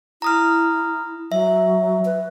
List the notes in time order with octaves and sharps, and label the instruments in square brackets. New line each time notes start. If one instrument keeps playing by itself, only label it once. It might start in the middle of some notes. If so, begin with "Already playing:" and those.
[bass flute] E4 [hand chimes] A#5 D#6 F6
[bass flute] F#3 [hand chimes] E5
[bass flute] B4